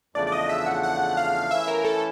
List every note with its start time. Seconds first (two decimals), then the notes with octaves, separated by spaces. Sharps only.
0.15 E2 C#3 F3 A3 D4 D5
0.27 D5
0.32 D#5
0.49 E5
0.66 F#5
0.83 F#5
1.17 F5
1.51 E3 A3 C#4 E4 E5
1.68 A#4
1.85 A4